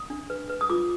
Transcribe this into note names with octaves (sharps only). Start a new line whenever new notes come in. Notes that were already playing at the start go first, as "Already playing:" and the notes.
Already playing: D#6
D4
B4
B4
D#6
F4 D6